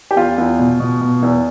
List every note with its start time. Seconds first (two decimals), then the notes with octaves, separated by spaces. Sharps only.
0.11 G4
0.16 E2 F4
0.38 E2
0.59 B2
0.80 B2
1.01 B2
1.23 E2